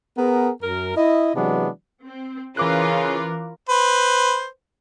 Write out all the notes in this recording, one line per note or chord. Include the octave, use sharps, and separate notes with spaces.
B3 G#4 A#4
F#2 A#4
E4 D#5
C3 E3 F#3 G#3 B3 D4
C4
C#3 E3 C#4 F4 A#4 B4 D6 F#6
B4 C5